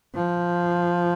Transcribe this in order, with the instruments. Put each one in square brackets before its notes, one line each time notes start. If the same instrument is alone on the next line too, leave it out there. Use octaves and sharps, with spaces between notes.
[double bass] F3